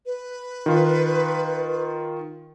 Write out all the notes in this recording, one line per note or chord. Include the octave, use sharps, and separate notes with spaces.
B4
D#3 F4